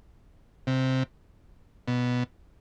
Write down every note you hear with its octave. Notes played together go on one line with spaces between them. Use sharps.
C3
B2